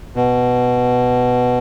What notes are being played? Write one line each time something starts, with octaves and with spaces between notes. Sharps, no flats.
B2